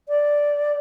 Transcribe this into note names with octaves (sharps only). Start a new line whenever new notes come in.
D5